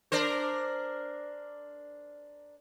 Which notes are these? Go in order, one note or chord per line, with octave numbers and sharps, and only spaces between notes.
D4 A#4 C5